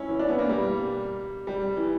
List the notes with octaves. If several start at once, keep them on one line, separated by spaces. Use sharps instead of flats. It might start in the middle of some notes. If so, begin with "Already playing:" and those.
Already playing: C#4 E4
E3
D4
B3
A#3
G3
G3
E3